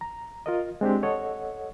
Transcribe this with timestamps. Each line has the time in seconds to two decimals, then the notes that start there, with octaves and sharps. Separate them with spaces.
0.01 A#5
0.46 F4 A#4 D#5
0.81 G#3 C4 D4 G4
1.03 A4 C#5 D#5 F#5